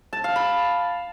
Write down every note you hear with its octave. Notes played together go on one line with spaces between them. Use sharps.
A5
F5
B5